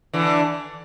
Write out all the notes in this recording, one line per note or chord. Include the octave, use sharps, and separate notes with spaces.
D3 E3